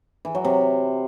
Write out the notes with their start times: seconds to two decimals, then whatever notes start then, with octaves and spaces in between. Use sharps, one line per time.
0.25 E3
0.35 F#3
0.45 C3